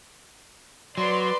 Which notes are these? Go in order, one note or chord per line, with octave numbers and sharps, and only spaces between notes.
F#3 B4 D5 C6